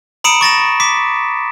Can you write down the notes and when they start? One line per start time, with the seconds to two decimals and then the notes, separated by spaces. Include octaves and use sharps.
0.24 A#5 B5 D#6 C#7 D7 E7
0.41 C#6 A6 A#6 E7
0.80 D6 B6